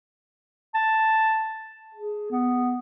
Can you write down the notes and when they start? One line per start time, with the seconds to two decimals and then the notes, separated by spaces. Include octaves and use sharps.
0.74 A5
1.95 G#4
2.31 B3